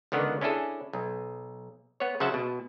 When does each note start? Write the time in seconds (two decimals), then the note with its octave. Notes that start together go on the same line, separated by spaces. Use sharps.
0.12 C#2 D3 D#3 B3 D5
0.41 C#4 D4 E4 G#4 A4
0.93 B1
2.00 B3 C#5
2.20 C#3 F#3 C5 E5 F#5 A5
2.34 B2